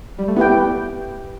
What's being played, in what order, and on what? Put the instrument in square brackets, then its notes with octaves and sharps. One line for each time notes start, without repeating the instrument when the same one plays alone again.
[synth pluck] G3
A3
[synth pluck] B3 [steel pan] E4 G4 B4 G5